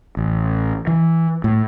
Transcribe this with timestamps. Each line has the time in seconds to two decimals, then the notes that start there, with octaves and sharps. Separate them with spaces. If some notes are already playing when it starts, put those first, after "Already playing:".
0.17 A1
0.87 E3
1.44 A2